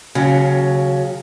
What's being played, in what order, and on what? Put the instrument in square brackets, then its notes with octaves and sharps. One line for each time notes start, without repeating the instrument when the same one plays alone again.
[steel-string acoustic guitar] D#2 C#3 F#3